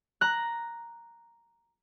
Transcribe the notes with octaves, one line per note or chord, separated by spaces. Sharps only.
A#5 F#6